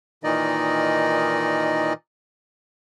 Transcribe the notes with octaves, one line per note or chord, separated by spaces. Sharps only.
A#2 D#3 E3 D#4 D5 D#5